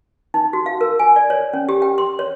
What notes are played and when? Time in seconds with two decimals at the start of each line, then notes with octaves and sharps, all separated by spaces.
0.34 D#4
0.53 F#4
0.66 F5
0.81 A#4
0.99 G#5
1.16 D5
1.30 C#5
1.53 C#4
1.69 G4
1.82 G5
1.98 C6
2.19 C#5